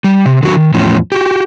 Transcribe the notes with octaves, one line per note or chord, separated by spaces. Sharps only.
G3
C3
D3 D#3 F#3 F#4
D#3
E2 A2 F3 C#4
F#4 G4